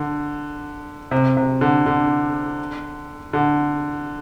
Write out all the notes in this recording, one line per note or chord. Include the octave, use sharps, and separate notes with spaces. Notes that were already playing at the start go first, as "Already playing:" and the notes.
Already playing: D3
C3
C3
D3
D3
D3